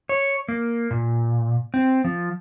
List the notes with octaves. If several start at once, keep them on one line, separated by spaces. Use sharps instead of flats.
C#5
A#3
A#2
C4
F3